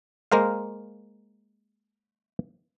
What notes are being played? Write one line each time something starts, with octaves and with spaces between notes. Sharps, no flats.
G#3 A#3 A#4 C5 F5